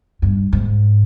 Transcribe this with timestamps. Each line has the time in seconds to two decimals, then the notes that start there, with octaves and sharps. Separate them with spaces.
0.22 G2
0.53 G#2